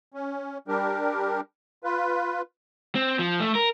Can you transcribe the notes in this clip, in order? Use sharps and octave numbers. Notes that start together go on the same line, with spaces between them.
C#4
G3 D4 G4 A#4
F4 B4
C4
F3
A3
A#4